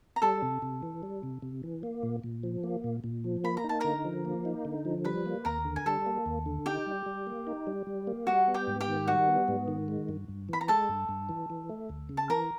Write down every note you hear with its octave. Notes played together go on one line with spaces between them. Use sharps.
A#5
G3 A4 A5
C3
C3
E3
G3
C3
C3
E3
A#3
A#2
A#2
F3
A#3
A#2
A#2
F3
A#3 B5
A#5
D#4
A5
D3 A#4 A#5
F3
A#3
D#4
D3
F3
G3 B4 B5
A#3
D#2 A#4 A#5
D3
G#5
G3 A4 A5
A#3
D#2
D3
D#4 G4 G5
G3
G3
A#3
D#4
G3
G3
A#3
G3 F#4 F#5
B3
G4 G5
G#2
G4 G5
D#3
G3 F#4 F#5
B3
G#2
D#3
G#3
G2
G2
E3 B5
A#5
G#3 A4 A5
G2
G2
E3
E3
A3
D2
C#3
A5
E3 A#4 A#5